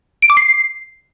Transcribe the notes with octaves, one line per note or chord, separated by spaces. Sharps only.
D7
D6
C7